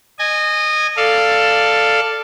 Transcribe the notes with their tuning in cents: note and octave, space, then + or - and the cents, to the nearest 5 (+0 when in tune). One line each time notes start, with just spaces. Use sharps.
D#5 -20 G#5 +0
A4 +10 D5 +0 F5 -5